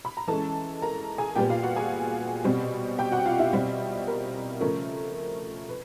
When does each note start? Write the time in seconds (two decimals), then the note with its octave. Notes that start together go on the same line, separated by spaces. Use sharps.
0.05 B5
0.17 A#5
0.28 E3 G#3 C#4 A4 A5
0.82 A#4 A#5
1.18 G#4 G#5
1.35 A#2 G3 B3 G4 G5
1.49 F4 F5
1.63 F#4 F#5
1.76 G#4 G#5
2.44 B2 G3 C4
2.98 G4 G5
3.12 F#4 F#5
3.26 F4 F5
3.39 E4 E5
3.53 B2 G3 C4
4.07 A#4
4.60 C#3 F3 A3 C#4 A#4
5.69 B4